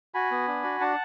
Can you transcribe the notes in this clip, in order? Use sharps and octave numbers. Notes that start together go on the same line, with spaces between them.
F#4 G#5 B5
B3
D4
F#4
D4 F#5 A5